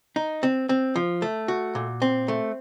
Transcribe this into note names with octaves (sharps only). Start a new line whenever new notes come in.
D#4
C4
C4
F3
A3
F#4
A#2
C4
A3